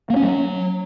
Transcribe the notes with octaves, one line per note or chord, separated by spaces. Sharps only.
A#3
C#4
F#3